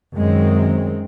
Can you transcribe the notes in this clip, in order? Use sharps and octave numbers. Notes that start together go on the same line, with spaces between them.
F#2 D#3 G#3 C4